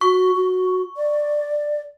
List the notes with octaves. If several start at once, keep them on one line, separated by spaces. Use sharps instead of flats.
F#4 C#6
F#4
D5